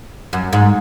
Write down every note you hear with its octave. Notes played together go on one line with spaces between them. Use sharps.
F#2
G#2